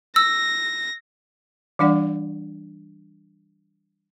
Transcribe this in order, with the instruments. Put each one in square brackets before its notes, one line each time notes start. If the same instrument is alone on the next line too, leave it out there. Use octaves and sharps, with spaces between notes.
[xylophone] E6 [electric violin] A#6
[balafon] E3 G3 D4 D5 F#5